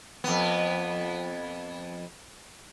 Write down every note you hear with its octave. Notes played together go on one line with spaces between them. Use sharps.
F2 B3